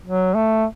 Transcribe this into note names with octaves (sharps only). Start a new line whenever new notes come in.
F#3
A3